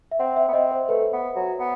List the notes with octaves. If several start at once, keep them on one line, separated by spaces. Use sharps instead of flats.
E5
C4 F#5
E5
B3
C4 D#5
C5
A3 B4
B3
F#3
B3